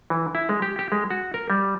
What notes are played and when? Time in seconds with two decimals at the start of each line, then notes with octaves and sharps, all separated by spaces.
0.10 E3
0.35 E4
0.49 G#3
0.62 G4
0.79 G4
0.92 G#3
1.10 F#4
1.34 A#4
1.50 G3